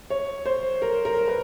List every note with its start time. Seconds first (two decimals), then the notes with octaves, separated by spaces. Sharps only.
0.10 C#5
0.46 C5
0.82 A#4
1.05 A#4
1.28 B4